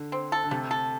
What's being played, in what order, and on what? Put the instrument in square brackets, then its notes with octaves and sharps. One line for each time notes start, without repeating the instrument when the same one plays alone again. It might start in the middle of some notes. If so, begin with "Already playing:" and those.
Already playing: [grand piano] D3
[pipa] C4
A4
[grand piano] D3
[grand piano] C3 [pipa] A3
[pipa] A4